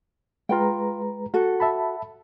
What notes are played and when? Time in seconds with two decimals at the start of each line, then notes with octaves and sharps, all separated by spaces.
0.49 G#3 F4 B4 G5 A#5
1.34 F#4 A4
1.60 E5 A5 B5